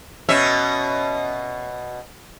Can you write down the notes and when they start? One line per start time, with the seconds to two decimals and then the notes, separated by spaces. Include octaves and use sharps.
0.29 B2 C#4 E5